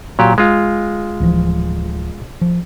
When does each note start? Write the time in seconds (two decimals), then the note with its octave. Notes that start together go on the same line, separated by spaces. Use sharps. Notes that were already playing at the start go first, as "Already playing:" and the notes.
0.19 A#2 F#3 G4
0.38 G#3 F4
1.20 D1 E3 F3
2.41 F3